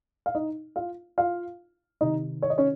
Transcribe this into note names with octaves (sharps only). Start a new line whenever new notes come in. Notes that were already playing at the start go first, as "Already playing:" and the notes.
F5
D#4 D#5
F4 F5
F4 F5
C3 D#3 D#4 D#5
C#5
D#5
C#4 C#5